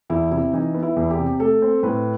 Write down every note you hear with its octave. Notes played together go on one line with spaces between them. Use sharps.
E2 E4
C3 E4
E3 D#4
B3
E4
E2
G4
C3
A3 A4
C4
A2 B4